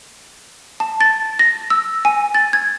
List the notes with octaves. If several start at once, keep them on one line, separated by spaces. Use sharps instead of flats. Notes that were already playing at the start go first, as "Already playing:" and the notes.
A5
A6
A#6
E6
G#5
A6
G#6